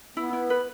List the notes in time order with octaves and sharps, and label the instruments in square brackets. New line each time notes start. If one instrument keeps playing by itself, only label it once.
[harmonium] B3 [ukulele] E4
[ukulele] E4
B4